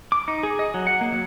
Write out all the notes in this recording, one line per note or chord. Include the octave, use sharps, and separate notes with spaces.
D6
D#4
G#4
D#5
F#3
F#5
A#3
F#3